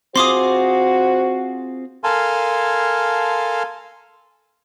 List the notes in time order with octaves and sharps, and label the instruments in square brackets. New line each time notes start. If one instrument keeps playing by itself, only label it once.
[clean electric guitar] C4 F4 G#4 [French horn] F#4 [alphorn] C5 [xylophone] C6 D6 D#6
[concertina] A4 A#4 F5 G#5 A5 C6